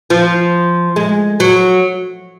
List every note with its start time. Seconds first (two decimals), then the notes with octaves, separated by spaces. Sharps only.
0.10 F3
0.96 G#3
1.40 F#3